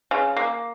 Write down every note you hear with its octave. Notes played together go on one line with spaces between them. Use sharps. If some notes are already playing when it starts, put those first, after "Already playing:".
C#3
A#3